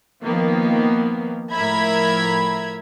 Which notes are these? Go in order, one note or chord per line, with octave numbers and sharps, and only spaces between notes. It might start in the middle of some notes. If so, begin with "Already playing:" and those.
D#3 F3 A#3 B3
A2 F3 A#4 E5 B5 G#6